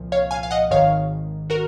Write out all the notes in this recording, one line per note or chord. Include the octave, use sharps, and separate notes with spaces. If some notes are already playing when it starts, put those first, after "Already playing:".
Already playing: C2 A#2 F3
C#5 F5
F5 G#5
F5
D#5 F#5
G#1 G#2 D#3 C#5 F5
F#4 A#4